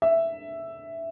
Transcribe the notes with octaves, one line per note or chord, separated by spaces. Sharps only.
E5